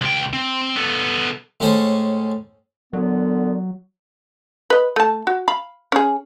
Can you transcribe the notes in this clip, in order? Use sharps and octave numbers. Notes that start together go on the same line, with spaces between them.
C#2 G5
C4
B3 A4
A2 G#3 C#4 A4 C5 A5
A#2 D3 F#3 B3
B4 D#5
A3 A5
F#4
F5 B5
C#4 G#4